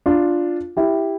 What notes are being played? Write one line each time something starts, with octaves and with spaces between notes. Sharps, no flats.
D4 F4
E4 G4